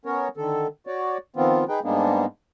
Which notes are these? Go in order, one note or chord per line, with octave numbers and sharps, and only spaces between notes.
B3 C#4 A#4 C#5
D3 D#3 A4
F#4 C#5 D5
D#3 F3 B3 C4 F4
D#4 G#4 B4 G5
G#2 G3 G#3 A#3 B3 D4